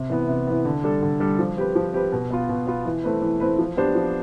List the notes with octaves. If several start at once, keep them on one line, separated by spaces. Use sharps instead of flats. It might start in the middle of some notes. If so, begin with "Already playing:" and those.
Already playing: C3
E3 B3
C3
E3 B3
D3
G3 D4 A4
D3
G3 D4 A4
F3
C4 G4 B4
F3
C4 G4 B4
B2
B3 F4
B2
B3 F4
E3
A3 C4 E4 B4
E3
A3 C4 E4 B4
F3
B3 D4 G4 C5
F3